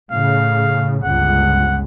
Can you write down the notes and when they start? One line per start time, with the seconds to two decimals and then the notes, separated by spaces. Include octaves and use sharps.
0.11 A2 C#3 F5
1.04 G1 C#2 F#5